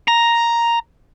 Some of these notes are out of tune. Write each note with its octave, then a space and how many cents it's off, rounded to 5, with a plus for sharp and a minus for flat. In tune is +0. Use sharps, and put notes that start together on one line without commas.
A#5 +5